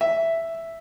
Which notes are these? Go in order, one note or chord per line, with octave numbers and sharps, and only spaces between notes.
E5